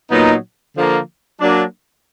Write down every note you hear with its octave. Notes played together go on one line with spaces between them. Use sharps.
A#2 F#3 B3 D#4
D3 F3 A#3
F#3 A#3 D4